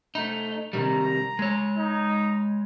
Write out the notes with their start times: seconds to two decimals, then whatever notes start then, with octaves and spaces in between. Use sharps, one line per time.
0.15 A3 D#4
0.73 C3 D#3 G3 A#5
1.39 G#3 C#5
1.78 D#4